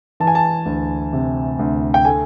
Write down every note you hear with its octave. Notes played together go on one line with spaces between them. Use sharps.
E3 A5
G#5
A5
D2
C3
D2
G5
A3 G#5